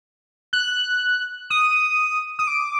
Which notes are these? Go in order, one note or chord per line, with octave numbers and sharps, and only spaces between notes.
F#6
D#6
D#6
D6